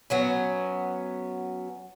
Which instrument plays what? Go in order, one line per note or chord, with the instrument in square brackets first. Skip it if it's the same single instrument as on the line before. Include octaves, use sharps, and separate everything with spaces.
[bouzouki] F#3 B3 C#4